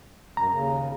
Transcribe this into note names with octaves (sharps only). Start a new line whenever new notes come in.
F#2 A#5
D#2 C#3